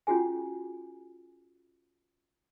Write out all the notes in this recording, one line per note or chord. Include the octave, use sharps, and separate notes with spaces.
C#4 F4 F#4 G#4 G#5